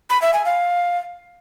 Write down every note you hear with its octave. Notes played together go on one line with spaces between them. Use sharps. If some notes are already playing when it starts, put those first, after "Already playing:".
B5
E5
G#5
F5